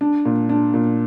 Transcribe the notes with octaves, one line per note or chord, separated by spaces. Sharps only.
D4
A#2
D4
A#2